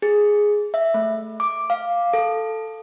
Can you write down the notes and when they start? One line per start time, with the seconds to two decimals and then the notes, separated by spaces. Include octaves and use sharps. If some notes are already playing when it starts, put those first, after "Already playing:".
0.02 G#4
0.74 E5
0.94 A3
1.40 D6
1.70 F5
2.13 A4